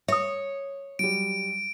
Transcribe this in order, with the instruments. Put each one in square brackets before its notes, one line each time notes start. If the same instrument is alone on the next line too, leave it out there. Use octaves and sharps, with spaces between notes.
[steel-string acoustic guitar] C#5 [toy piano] E5 D#6
[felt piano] F#3 G3 [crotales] D7